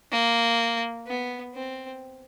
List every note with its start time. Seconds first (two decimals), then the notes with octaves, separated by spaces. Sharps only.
0.12 A#3
1.07 B3
1.55 C4